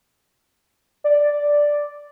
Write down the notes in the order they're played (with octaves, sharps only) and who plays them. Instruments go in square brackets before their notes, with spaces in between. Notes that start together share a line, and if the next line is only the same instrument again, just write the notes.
[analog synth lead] D5